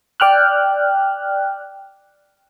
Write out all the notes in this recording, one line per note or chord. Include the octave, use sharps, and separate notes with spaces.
D5 G5 F6 F#6